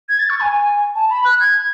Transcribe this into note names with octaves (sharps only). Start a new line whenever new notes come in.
G#6
A6
C#6
G#5
G#5
A5
B5
F#6
G#6